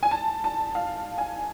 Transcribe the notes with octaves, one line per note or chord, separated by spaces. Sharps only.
G#5
A5
A5
F5
G#5